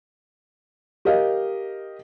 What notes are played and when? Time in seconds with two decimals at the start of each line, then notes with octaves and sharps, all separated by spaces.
1.05 G4 A#4 D#5 F5